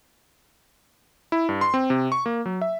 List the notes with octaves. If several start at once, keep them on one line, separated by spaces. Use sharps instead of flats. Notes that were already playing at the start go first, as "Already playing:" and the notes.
E4
G2
C6
C4
C3
C#6
A#3
F#3
E5